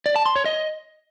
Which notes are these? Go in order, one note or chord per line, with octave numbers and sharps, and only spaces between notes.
D5
A5
C6
C#5
D#5